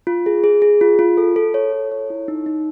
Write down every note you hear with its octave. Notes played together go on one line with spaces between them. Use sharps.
F4
G#4
G#4
G#4
F4
F4
A4
A4
C#5
A4
C#5
E4
D#4
D#4